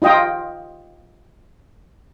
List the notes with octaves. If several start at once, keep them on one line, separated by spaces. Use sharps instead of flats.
D#4 F4 D#5 G5